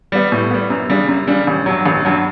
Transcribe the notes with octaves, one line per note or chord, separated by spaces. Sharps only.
G3 B3
A2
G3 B3
F#2
C#3 G3 D4
F#2
C#3 G3 D4
A1
G2 F#3
A1
G2 F#3